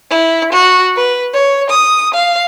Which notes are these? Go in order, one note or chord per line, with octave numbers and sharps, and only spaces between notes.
E4
F#4
B4
C#5
D#6
F5